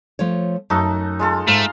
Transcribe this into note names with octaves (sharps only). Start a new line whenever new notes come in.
F3 A3 C#5
F#2 A3 D#4 F#4
G#3 F4 A4
G#2 A3 F5 A#5 C6